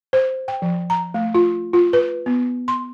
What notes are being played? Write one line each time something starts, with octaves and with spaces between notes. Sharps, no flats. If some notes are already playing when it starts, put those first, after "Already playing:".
C5
G5
F3
A#5
A3
F4
F4
B4
B3
C6